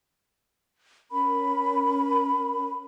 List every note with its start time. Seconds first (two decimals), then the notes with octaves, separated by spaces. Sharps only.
1.11 C#4 A#4 B5